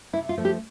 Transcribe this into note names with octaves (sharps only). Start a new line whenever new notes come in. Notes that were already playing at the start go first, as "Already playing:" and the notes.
C3 E4
F4
F3 A3
G4